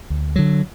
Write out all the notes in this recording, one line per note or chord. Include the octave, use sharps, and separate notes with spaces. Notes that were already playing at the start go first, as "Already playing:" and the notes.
D2
D3 F#3